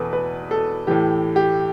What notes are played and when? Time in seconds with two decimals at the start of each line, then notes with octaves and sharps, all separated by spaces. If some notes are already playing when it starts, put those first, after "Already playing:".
Already playing: E2 B2 A4 B4
0.13 B4
0.51 A4
0.87 A2 E3 G4
1.36 G4